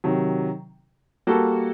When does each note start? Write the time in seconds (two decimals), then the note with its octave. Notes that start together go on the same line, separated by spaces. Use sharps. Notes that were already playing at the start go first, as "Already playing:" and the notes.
0.04 C3 D#3 F#3
1.27 G3 A#3 F#4 A4